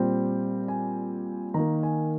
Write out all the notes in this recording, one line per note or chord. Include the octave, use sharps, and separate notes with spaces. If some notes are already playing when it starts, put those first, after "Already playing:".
Already playing: A#2 G3 C4 G5
G#5
D#3 A#3 A#5
G#5